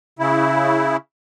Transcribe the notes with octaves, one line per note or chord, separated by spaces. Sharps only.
C#3 E4